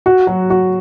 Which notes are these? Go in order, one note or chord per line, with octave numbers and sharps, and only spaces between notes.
F#4
F#3
F#4